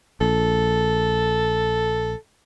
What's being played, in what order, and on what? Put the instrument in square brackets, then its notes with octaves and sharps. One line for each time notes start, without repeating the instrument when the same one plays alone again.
[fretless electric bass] A#1 [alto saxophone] A4